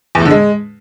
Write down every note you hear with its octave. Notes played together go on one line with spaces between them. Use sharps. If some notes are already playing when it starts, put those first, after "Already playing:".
E2
A2
D3
G#3